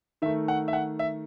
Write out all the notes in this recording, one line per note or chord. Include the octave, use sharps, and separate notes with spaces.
D#3 A3 E5
F#5
E5
F#5
E5